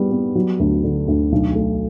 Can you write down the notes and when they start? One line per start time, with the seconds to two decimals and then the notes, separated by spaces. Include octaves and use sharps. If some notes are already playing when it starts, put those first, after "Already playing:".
Already playing: G3 B3
0.12 B3
0.35 F#3
0.60 D2
0.84 D3
1.08 D2
1.32 B1
1.55 A3